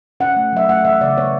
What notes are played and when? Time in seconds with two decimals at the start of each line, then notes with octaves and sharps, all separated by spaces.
0.20 C#4 F#5
0.36 A3
0.53 F#3 E5
0.69 A3 F#5
0.85 E3 E5
1.01 C#3 D5
1.17 B3 C#5